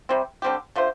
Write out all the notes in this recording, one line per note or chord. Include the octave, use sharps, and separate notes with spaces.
C3 G3 C4
D3 G3 C4 G4
D3 A3 F4 C5